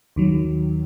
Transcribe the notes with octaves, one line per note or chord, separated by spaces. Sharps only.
D#2 D#3 F#3